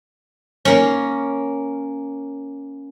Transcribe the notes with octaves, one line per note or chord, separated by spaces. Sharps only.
A#3 C#4